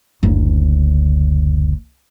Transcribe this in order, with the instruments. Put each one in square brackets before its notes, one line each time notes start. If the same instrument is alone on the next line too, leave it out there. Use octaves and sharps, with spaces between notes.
[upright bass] F#1 D2